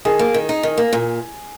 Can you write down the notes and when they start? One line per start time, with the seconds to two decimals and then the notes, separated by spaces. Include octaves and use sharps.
0.05 D#3 G#4
0.19 A#3
0.34 D#3
0.49 D#4
0.63 D#3
0.78 A#3
0.93 A#2